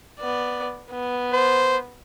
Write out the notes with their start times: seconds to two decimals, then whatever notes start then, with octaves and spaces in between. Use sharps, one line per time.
0.20 B3 D5
0.92 B3
1.33 C5